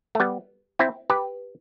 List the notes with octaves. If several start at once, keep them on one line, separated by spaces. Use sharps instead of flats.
A3
G3 B3
C4 E4
G4 B4